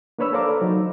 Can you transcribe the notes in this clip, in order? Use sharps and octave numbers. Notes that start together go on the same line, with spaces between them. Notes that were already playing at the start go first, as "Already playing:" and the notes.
A#3 D4 B4 C#5 B5 E6
A4 C5 D5 F5 A#5 D6
F#3 D#4